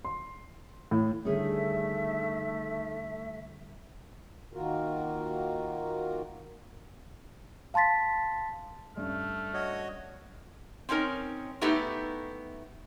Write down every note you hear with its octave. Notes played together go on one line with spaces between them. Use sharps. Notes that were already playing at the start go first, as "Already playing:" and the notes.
C6
A2
D3 D#3 G3 A3 C#4 G#4 E5
D#3 A#3 F4 F#4 A#4
F5 A5 C6 A6 B6
G2 A3 C#4 F6
F#4 C#5 D#5
C4 C#4 D#4 A#4
A3 B3 D#4 E4 G4 A4